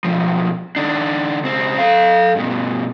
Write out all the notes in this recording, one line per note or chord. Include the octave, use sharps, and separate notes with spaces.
B1 F3
D#3 D4
C#2 C4
A4 F5
G2 B2